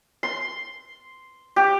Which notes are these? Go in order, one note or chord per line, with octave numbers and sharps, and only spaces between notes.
C6
G4